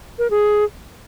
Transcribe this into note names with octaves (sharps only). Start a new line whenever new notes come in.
A#4
G#4